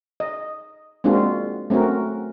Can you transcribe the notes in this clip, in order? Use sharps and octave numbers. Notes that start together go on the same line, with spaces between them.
D#5
G#3 A#3 C4 D4 F4 F#4
A3 C4 C#4 F#4 A#4